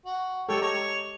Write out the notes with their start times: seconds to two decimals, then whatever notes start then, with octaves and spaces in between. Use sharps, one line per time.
0.06 F#4
0.49 G#3 G4 A4 C#5 G5
0.62 C#5 A#5